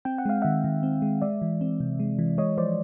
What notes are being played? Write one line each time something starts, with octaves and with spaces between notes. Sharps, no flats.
C4 G5
F#5
G#3 F5
D#3 E5 F#5
D#3
C4
G#3
G#3 D5 E5
E3
C4
C3
G#3
E3
G#3 C#5 D#5
F3 C5 D5